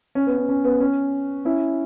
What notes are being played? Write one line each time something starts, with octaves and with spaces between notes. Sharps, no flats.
C#4
B3
C#4
C#4
B3
C#4
C#4 E4